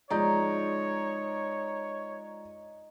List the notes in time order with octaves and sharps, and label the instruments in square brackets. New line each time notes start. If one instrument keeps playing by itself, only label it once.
[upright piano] F3 G#3 G6 [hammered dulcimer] D#4 [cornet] C#5 [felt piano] D5 A#5